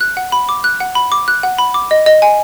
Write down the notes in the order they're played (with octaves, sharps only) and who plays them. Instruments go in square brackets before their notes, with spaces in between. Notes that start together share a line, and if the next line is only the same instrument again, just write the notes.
[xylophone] F#6
F#5
B5
D6
F#6
F#5
B5
D6
F#6
F#5
B5
D6
D#5
D#5
G#5